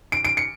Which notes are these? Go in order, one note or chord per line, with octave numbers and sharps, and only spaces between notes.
D7
D7
C#7